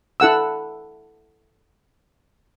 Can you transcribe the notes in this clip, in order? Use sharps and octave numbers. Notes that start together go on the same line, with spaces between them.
E4 A4 F#5 E6